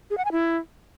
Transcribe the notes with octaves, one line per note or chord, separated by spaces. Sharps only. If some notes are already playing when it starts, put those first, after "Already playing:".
G#4
F#5
G#5
E4